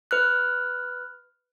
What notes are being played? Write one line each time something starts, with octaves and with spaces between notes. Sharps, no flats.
B4 F6 F#6